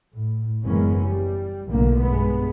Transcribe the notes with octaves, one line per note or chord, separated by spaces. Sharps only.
A2
F#1 E3 G#3 A#3 B3 C#4
G3
B1 A2 D3 A3 A#3
G2 G#3 B3